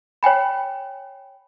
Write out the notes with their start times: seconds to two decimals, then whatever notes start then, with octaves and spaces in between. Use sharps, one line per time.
0.23 C#5 G5 G#5 B5